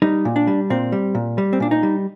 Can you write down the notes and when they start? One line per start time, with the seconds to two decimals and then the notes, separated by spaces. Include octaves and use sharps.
0.02 G3 D#4
0.25 A#2
0.36 D4
0.47 G3
0.70 A#2 C4
0.92 G3
1.15 A#2
1.38 G3
1.53 C4
1.60 A#2 D4
1.71 D#4
1.83 G3